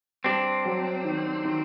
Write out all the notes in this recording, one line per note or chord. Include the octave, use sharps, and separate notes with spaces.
G2 C4 D4
F#3
D#3
D#3